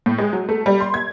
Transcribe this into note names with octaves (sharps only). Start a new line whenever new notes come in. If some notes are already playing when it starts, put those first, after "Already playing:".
A2
G#3
F#3
A3
G3
C6
G#6